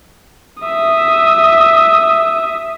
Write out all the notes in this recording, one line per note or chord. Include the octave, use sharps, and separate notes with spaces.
E5 D#6